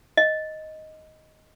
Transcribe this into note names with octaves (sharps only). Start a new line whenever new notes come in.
D#5